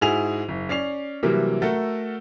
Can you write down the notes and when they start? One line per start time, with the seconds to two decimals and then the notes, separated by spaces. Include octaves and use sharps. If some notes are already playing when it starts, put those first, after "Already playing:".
0.01 G#2 E4 F#4 G#4 G#5 F7
0.48 F#1
0.69 C#4 D5 C7 F7
1.23 C3 E3 F#3 G3 A#3
1.62 A3 F#4 A4 A#4